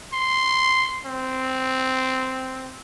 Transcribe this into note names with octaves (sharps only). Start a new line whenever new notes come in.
C6
C4